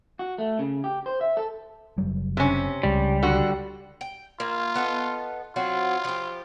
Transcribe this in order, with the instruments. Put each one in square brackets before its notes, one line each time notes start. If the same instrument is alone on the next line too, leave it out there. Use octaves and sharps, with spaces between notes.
[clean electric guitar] F#4
A3
C#3
G4
C5
E5
A4
[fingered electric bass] F#1 F#3 G3
[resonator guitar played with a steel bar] C3 C#4
[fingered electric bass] C#2 C#3 G#3 [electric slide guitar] G3
[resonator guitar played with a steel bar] D3 F#4
[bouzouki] G5
[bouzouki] A#3 [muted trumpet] F4
[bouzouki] B3 A4 D#5
[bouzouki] F#3 C4 F#4 [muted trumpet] F4
[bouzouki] F3 G4